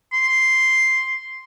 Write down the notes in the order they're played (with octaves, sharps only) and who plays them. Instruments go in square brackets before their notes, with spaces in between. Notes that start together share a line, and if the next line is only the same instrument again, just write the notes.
[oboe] C6